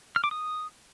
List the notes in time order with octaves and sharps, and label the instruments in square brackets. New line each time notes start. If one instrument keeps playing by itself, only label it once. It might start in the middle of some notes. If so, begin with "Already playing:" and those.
[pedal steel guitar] F6
D6
D#6